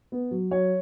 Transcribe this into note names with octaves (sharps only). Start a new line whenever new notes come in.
B3
F#3
F#3 C#5